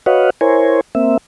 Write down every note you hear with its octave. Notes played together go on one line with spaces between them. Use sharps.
F#4 B4 C#5 D#5 F5 F#5
E4 A#4 C5 C#5 G#5
A#3 C4 E5